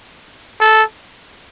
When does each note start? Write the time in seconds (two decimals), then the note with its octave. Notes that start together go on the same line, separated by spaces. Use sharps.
0.61 A4